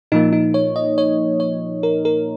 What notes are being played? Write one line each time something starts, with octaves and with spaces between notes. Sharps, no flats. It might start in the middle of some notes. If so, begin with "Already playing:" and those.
A#2 F3 A#3 D#4
D#4
C#5
D#5
C#5
C#5
A#4
A#4